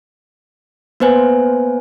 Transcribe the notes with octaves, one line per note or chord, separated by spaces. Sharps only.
A#3 B3 B4 C5 G#5